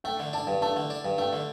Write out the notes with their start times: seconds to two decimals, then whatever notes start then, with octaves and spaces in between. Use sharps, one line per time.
0.04 A3 G5
0.20 D3
0.33 D4 A5
0.47 G2
0.62 A3 A5
0.76 D3
0.90 D4
1.05 G2
1.18 A3 G5
1.33 D3